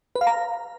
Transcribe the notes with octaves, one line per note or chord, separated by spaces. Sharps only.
B4
F5
A#5